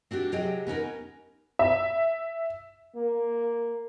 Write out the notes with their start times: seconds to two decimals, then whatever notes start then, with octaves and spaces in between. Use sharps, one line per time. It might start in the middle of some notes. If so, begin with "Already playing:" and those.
0.11 C4 D4 F#4 G4
0.32 C3 F#3 G4 G#4 D#5 G5
0.67 B3 C#4 D#4 A#4
1.59 E5
2.96 A#3